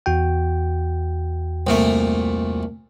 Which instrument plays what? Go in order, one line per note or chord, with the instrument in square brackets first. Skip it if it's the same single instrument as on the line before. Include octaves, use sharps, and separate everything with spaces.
[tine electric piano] E2 F#4 G5
[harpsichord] C2 A#2 A3